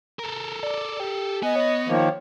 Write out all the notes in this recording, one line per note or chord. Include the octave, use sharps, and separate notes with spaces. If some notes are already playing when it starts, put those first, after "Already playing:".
A4 A#4
D5
G4
B3 D#5 G#5
C#5
D#3 F3 A#3